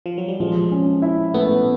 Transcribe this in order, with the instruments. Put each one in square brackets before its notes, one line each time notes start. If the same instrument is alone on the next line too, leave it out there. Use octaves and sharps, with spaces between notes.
[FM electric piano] F3
F#3
G3
[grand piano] F3 [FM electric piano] G#3
[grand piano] C#4
E4
[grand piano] A3 [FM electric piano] B3